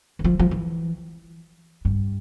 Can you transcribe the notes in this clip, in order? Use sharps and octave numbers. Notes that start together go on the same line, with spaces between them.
E3
F3
F3
E3
G2